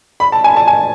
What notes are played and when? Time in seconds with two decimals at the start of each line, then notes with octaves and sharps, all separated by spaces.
0.20 B5
0.32 A5
0.44 G#5
0.56 A5
0.67 G#5